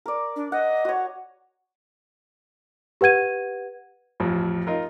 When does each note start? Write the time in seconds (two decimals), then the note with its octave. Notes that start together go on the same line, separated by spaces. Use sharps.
0.06 A#4 D5
0.36 D4
0.52 D#5 F#5
0.85 F#4 C#5
3.01 G4 B4 F#5 G#6 D#7
4.20 A1 F2 F3
4.67 D#4 F4 A#4